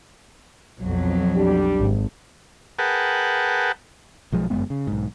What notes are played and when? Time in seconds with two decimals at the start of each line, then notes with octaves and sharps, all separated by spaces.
0.80 B1 F2 F#3
1.35 G3 D4 G4
1.77 G#1
2.79 G#4 A#4 B4 F#5 G5 A5
4.32 B1 F3 G#3
4.50 G1 F#2 G#3 B3
4.70 C#3
4.87 B1 G#2